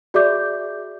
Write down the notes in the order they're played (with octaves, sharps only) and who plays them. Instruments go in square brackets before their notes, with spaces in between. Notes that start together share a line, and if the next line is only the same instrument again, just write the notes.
[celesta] F#4 G#4 D5 E5 D6 G6